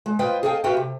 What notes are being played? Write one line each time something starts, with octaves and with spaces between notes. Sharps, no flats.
G#3
F4 B4 C5 D#5 F5 G5
G#4 A4 D#5 F5 G5
F#4 G4 B4 E5 F5 G5
C3